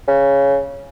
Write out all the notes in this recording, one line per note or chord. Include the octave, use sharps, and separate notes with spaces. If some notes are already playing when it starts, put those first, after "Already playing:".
C#3